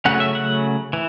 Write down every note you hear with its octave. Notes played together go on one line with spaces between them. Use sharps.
C#3 F#3 A3 C#4 F#5
E5
F#5
E3